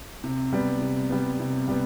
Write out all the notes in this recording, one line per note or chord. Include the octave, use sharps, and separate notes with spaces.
C3
G3 B3
C3
G3 B3
C3
G3 B3